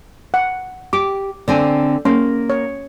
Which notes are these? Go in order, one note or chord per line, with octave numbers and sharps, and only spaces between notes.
F#5
G4 D6
D3 C4 D5 G#5
A#3 C#4 C6
C#5